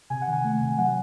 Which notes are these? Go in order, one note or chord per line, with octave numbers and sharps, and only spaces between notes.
C3 G#5
F#5
D#3
G#5
A3
C3
F#3 F#5